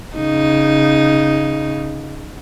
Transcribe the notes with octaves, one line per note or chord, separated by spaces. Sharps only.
C#3 D#4